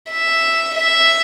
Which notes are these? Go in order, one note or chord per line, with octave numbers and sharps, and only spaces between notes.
E5
E5